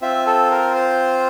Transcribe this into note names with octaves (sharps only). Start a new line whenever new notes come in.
C4 F4 E5
A4
A#4
C5